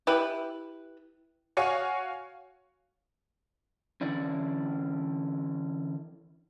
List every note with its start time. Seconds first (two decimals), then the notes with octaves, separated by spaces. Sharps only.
0.07 E4 G4 B4
1.57 F#4 C#5 F5 G#5 C#6
4.01 D3 E3 C#4 E4 D5